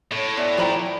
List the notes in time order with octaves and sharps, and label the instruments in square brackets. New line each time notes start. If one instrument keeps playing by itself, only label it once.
[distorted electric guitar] A2 [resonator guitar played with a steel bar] C#5
[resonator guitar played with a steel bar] B3 E5 G#5 [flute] D5
[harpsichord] F3 E4 [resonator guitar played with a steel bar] G5 A#5